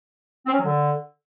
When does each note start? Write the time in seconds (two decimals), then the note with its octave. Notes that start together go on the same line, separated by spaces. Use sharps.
0.47 C4
0.53 C#4
0.59 F#3
0.64 D3